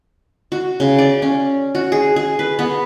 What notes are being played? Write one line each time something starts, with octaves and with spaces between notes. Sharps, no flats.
F#4
C#3
D5
C#4
F#4
G#4
G#4
B4
B3